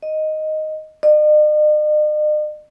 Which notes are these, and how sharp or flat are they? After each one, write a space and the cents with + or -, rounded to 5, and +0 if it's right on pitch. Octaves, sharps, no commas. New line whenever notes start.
D#5 +0
D#5 -45